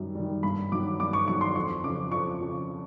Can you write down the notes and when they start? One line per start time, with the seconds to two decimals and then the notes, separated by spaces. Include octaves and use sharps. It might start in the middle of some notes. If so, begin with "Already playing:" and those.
Already playing: F#2 D#3 G3
0.15 D#3 G3
0.43 G2 B5
0.72 D#3 F#3 D6
1.00 G2 D6
1.13 C#6
1.27 D#3 F#3 C#6
1.41 C6
1.55 F2 C#6
1.84 C#3 F3 D6
2.12 F2 C#6
2.40 C#3 F3